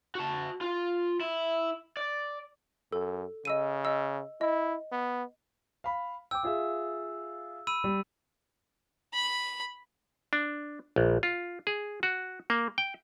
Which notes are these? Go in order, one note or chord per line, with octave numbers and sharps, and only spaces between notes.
F#4 A5
F4
E4
D5
F#2 A4
C#3 D#5 E6 D#7
D#5 E6
E4 D#5
B3
F5 B5
G5 D6 E6
F4 G#4 E5
B5 E6 D#7
G3
B5
D4
A#1
F4
G#4
F#4
A#3
G5